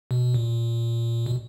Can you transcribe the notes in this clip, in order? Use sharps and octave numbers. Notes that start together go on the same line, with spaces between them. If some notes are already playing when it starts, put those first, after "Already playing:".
B2
A#2
B2